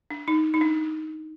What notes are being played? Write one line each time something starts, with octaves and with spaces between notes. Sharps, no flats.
D4
D#4
D#4
D4